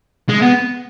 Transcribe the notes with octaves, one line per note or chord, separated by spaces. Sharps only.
G#3
B3